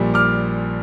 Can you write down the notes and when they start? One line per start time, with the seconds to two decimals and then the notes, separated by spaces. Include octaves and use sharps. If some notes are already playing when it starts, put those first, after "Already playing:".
Already playing: A#1 A#2 G3
0.14 D6 F6